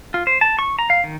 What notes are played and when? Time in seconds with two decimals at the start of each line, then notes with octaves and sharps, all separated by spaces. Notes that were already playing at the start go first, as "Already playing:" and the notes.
0.14 F4
0.27 C5
0.41 A5
0.59 C#6
0.79 A#5
0.90 F5
1.04 D#3